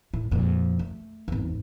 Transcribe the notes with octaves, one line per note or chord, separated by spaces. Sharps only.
A2
F2 A#2
A3
G#1 E2